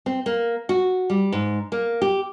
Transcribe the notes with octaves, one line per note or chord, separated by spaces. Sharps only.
C4
A#3
F#4
G3
G#2
A#3
G4